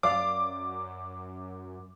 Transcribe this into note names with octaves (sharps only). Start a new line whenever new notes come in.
F#2 D5 F5 D6